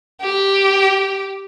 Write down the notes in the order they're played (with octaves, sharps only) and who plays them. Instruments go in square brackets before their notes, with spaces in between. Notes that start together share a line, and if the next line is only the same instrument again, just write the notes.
[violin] G4